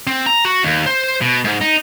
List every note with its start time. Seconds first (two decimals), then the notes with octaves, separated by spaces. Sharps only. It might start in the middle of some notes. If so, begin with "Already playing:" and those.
0.07 C4
0.26 A#5
0.45 F#4
0.63 D#2
0.86 C5
1.21 B2
1.45 G#2
1.61 D#4